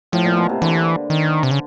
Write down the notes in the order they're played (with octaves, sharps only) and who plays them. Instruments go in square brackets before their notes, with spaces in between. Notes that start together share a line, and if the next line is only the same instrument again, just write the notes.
[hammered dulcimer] A2 [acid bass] F3
[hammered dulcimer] A#2
B2
C3
[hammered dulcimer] D3 [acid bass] E3
[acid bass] D#3
C3
C#3